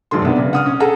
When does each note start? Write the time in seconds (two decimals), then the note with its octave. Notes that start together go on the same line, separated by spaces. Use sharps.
0.11 E1 F#2 D#3 C6
0.25 C3 B3 D4
0.38 C#3
0.53 F#5 D#6 F6
0.66 C#4
0.80 G#4 A4 F#5 A#5